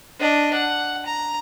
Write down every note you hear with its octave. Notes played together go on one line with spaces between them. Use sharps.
D4 D#5
F#5
A#5